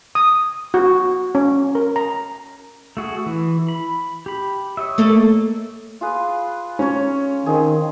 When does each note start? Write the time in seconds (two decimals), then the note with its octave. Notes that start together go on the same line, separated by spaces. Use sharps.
0.15 D#6
0.74 F#4
1.35 C#4
1.75 A#4
1.96 A#5
2.97 A3 F#4 G#4
3.26 E3
3.68 B5
4.26 G4 B5
4.77 C#5 D#5 E5
4.98 A3 A#3 A4
6.01 F4 G#4 B4
6.79 C#4 C#5 A#5
7.46 D#3 C4 G#4